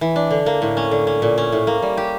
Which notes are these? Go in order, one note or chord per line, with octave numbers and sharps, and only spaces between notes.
E3
D4
D3
A#3
A2
C#4
D3
C#4
A#2
C#4
A2
A#3
G3
G4